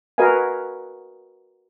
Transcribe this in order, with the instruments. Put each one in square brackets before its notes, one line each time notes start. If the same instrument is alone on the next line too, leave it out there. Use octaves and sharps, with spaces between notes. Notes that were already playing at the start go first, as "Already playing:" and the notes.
[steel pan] F#4 A#4 B4 D#5 F5 G#5